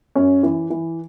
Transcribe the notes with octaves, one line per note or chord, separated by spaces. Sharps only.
F#2 C#4
E3
E3